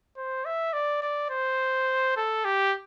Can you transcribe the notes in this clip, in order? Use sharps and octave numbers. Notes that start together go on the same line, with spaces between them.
C5
E5
D5
D5
C5
A4
G4